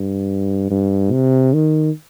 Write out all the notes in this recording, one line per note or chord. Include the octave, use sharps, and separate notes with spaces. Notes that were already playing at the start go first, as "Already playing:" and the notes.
Already playing: G2
G2
C3
D#3